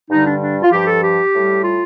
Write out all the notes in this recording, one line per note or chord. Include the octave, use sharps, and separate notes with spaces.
G2 D3 G3 D#4
D4
D4
F4
G2 F3 G4
A4
G4
A2 G3
F4